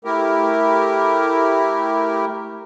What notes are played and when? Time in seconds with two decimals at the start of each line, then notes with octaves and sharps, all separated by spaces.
0.05 A3 E4 G4 A#4